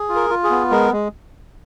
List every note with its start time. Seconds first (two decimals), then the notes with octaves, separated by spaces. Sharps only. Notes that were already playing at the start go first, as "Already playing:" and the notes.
Already playing: G#4
0.09 F4
0.15 A#4
0.30 F4
0.44 G#4
0.50 B3
0.71 G#3 A#4
0.92 G#3